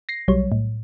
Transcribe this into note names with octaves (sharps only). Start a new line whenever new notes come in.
A#6 C7
B1 F#3 G3 C#5
A2